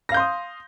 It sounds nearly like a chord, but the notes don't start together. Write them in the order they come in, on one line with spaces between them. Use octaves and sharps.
A#6 F5 G6 C6 D#6